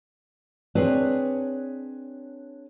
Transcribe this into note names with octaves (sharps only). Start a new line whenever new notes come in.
C4 D4 G#4 B4 C#5